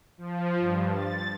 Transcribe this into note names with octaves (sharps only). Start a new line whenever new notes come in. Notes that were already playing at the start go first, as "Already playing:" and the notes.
F3
G2
A6